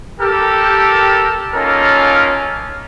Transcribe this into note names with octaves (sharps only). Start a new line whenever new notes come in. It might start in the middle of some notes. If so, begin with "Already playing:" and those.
G4 A4 A#4
A#3 C#4 D#4 F4 A4 A#4